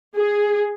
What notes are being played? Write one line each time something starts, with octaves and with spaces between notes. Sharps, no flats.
G#4